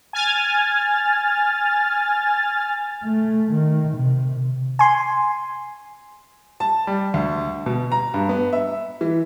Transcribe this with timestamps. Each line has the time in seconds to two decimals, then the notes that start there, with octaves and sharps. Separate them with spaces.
0.13 G#5 F6 A6
3.05 A3
3.52 D#3
3.96 C3
4.79 G#5 C6
6.60 A5
6.87 G3
7.14 D2
7.66 B2
7.92 A#5
8.14 G2
8.29 B3
8.53 E5
9.01 E3